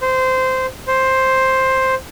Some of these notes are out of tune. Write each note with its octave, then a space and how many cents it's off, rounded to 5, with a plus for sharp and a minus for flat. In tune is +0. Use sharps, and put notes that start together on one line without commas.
C5 -15
C5 +5